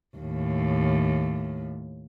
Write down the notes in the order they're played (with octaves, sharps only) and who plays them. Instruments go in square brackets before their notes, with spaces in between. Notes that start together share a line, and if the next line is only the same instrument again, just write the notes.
[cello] D#2 A2